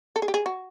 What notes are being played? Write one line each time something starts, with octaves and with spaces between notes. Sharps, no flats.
A4
G#4
G4
G#4
F#4